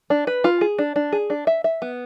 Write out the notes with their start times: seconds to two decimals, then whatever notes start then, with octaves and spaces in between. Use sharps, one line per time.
0.10 D4
0.27 B4
0.44 F4
0.61 G#4
0.79 D4
0.96 D4
1.12 G#4
1.30 D4
1.47 E5
1.64 E5
1.82 B3